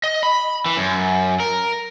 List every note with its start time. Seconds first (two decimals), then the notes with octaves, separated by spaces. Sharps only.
0.04 D#5
0.23 B5
0.66 E3
0.77 F#2
1.40 A#4